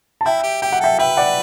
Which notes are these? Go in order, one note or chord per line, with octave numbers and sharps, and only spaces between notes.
A5
E4 E5 G5
G4
G4 G5
F#5
A4 E5 G5
B4 E5 G5
D5 F#5